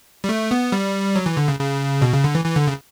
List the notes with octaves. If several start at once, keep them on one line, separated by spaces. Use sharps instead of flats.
G3
A3
B3
G3
F#3
E3
D3
C#3
C#3
B2
C#3
D3
E3
E3
D3
C#3